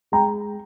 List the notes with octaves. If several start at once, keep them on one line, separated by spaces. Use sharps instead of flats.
G#3 G5 A#5